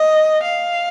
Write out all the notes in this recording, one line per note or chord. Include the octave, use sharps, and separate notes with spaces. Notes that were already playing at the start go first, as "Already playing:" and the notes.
Already playing: D#5
F5